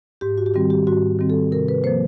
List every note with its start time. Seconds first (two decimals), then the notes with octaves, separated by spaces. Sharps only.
0.21 G#2 G4
0.38 F#4
0.46 G4
0.54 D#3 G3 C4 F#4
0.70 G4
0.87 G#2 F#4
1.19 D#3 G3 C4
1.30 A4
1.52 C3 A#4
1.68 B4
1.84 F3 A#3 C5